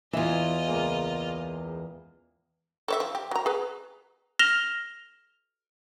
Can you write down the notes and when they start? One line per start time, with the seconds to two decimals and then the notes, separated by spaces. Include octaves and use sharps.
0.13 E2 E3 F4 D#5 E5
0.68 C#2 A#3 G#4
2.88 A4 C#5 E5
3.00 F3
3.15 G4
3.31 F#3 A#5
3.46 G#4 B4
4.39 F6 A#6 E7 F7 G7